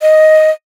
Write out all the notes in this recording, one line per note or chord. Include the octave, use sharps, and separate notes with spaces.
D#5